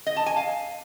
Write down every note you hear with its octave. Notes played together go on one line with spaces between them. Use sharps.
D#5
A5
G#5
F5